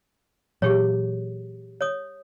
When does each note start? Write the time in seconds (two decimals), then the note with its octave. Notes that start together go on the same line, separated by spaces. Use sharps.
0.62 A#2 E3 F#3 G4 G#4 C#5
1.81 C#5 D#6